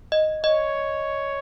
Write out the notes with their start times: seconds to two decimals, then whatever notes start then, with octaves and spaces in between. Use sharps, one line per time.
0.12 D#5
0.43 C#5 D#5